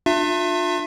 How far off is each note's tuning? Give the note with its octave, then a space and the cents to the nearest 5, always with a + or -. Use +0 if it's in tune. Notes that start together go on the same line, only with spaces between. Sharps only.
D4 +40 F4 +35 E5 +20